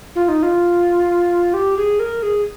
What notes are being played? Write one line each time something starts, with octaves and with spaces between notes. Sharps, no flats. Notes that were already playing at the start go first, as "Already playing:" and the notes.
F4
D#4
F4
G4
G#4
A#4
G#4